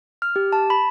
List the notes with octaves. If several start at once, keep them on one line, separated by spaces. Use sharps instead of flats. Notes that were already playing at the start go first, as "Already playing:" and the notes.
F6
G4
A5
B5